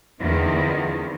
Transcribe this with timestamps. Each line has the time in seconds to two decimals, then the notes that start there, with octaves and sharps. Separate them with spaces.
0.19 E2 D3 D#3 F3 A#3 C4